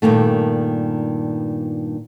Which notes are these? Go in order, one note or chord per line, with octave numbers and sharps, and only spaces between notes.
G2 A#2 D#3 A3